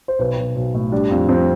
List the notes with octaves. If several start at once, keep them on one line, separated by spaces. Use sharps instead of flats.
C5
B1 B4
B1
B1
A2
G3 D4
F2
F2 C4